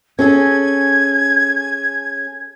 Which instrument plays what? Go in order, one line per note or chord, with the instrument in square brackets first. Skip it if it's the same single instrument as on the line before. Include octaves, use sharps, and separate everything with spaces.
[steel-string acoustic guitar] C#4 G#4 A4 [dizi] G#6